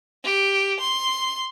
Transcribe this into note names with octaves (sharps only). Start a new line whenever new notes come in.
G4
C6